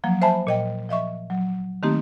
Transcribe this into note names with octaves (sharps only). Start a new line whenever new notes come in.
F3 F#3 A#3
C5 E5 G#5 A5 B5
A#2 D#5 G5
F3 D#5 E5 C#6
F#3
D#3 A3 A#3 C4 D#4 G4